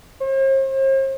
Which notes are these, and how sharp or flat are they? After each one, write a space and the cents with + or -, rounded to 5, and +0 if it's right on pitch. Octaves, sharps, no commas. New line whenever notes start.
C5 +45